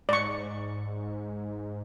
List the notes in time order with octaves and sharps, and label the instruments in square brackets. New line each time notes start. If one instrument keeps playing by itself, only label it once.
[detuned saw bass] G#2 [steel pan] D5 C#6